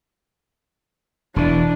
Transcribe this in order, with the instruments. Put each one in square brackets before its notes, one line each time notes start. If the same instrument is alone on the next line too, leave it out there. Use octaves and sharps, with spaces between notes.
[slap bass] E1 E3 [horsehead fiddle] D4